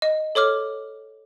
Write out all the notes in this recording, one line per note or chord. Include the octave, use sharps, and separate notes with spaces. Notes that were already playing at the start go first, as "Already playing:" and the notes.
D#5
A4 C#5 D6 F6